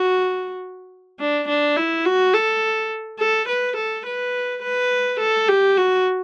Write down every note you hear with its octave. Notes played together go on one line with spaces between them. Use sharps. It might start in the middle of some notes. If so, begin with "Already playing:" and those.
Already playing: F#4
D4
D4
E4
F#4
A4
A4
B4
A4
B4
B4
A4
G4
F#4